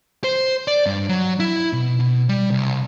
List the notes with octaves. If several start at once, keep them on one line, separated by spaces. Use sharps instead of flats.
C5
D5
G2
F#3
E4
B2
B2
G3
C2